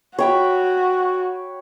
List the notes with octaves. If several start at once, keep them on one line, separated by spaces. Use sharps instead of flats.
F#4 C#5 G5 B5